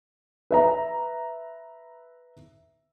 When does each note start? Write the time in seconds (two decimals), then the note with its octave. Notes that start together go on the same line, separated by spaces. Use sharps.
0.51 B4 E5 A#5